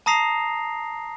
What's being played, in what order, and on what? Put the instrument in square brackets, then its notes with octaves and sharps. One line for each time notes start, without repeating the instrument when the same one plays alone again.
[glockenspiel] A5 A#5 D#6 A#6 C7 F7